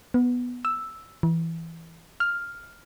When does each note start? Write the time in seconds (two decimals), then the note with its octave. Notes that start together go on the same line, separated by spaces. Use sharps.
0.14 B3
0.65 E6
1.23 E3
2.20 F6